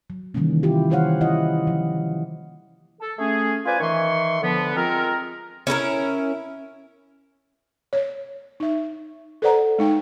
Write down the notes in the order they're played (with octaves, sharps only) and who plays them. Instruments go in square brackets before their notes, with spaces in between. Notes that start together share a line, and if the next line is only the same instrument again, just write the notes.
[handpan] F#3
C3 D#3 E3 G3 A#3 C#4
E4 F4 G4
D#3 E3 C5 C#5 F5 F#5
E4 F4 D#5 F#5
F3
[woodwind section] A4
A3 C#4 G#4
F4 B4 C5 D5 G#5
D#3 E3 E5 C6 C#6
D3 F3 B3
G#3 C4 F4 G#4 A#4
[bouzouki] C#4 E4 A4 A#4
[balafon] C#5
D#4 E5
A4 B4 C5 D5 F#5 A#5
G#3 D#4 G5